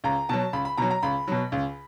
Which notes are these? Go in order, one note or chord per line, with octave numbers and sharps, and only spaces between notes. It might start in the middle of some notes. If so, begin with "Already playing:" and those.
C#2 A#5
B2 F#3 A5
C#2 B5
B5
B2 F#3 A#5
A#5
C#2 B5
B2 F#3
C#2